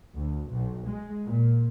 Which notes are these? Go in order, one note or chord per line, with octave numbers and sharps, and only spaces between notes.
D2
B1
G#3
A#2